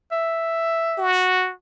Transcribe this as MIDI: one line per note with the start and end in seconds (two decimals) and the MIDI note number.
0.12 1.10 76
0.98 1.53 66